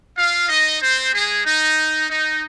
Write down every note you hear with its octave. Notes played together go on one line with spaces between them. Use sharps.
F4 F5
D#4 D#5
C4 C5
G#3 G#4
D#4
D#4